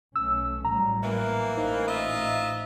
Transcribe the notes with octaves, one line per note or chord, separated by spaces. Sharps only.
B1 A3 C#4 E6
A1 F#3 G3 A#5
E3 A#3
A1 D#4 C5 F5
F4 D#5 E5